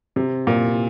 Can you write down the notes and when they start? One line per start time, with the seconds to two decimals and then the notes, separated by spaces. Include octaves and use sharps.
0.16 C3
0.47 A#2